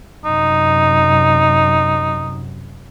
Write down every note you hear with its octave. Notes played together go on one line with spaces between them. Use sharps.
F#2 C3 D#4